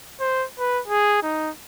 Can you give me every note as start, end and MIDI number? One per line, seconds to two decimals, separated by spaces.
0.20 0.45 72
0.59 0.80 71
0.88 1.21 68
1.23 1.50 63